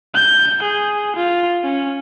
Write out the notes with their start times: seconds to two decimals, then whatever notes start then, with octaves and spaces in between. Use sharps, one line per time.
0.14 G6
0.63 G#4
1.16 F4
1.64 C#4